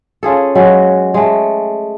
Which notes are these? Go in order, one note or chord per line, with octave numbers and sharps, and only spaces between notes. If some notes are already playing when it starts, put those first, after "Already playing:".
C#4 F4 G#4 A4
F#3 G#3
G#3 A3